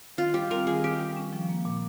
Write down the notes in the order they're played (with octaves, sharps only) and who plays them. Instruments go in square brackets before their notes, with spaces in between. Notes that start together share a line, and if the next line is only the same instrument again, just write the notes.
[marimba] D#3 [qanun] F4
[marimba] G3 [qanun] G4
[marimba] C4 [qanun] A#4
[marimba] D#3 [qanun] G#4
[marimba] D#3 [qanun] G4
[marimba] G3
C#4
F3
A#3
A#2